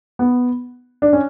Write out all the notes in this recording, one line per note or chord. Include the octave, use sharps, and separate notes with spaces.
B3
D4
C#4